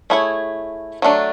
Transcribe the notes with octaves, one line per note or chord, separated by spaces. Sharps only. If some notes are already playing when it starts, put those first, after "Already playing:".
A3 E4 G#4 C#5
F#3 A3 D4